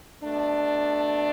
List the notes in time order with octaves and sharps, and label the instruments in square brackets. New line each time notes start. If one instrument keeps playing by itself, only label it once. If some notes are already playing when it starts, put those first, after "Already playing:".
[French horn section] B2 A3 D4